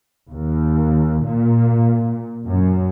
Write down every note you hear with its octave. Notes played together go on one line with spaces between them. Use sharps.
D#2
A#2
F#2